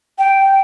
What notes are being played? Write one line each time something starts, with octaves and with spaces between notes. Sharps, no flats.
G5